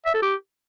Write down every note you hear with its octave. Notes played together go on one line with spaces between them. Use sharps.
E5
A4
G4